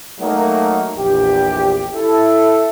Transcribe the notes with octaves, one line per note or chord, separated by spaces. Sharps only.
F#3 A3 A#3 D#4 F#4
A#1 E2 G4
E4 A4